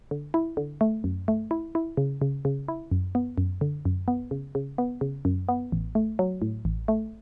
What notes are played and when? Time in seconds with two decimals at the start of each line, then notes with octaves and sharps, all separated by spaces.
0.11 D3
0.34 E4
0.57 D3
0.81 A3
1.04 F#2
1.28 A3
1.51 E4
1.75 E4
1.97 C#3
2.22 C#3
2.45 C#3
2.68 E4
2.91 F#2
3.15 B3
3.38 F#2
3.61 D3
3.85 F#2
4.08 B3
4.31 C#3
4.55 C#3
4.78 B3
5.01 C#3
5.25 F#2
5.49 B3
5.72 A1
5.95 A3
6.19 F#3
6.42 A2
6.65 A1
6.88 A3